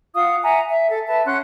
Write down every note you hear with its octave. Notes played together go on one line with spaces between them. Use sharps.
F4 F5 F#5 D#6
E5 F#5 G#5 A#5
E5
A4
B4 E5 A5
C#4 F#5 C6 F#6